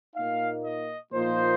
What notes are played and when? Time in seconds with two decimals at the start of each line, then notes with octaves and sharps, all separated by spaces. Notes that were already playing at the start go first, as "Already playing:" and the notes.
0.16 A#2 A#3 D#4 F5
0.64 D#5
1.12 A#2 F3 A#3 D#4 C5